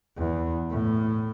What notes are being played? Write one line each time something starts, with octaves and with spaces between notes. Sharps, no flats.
E2
A2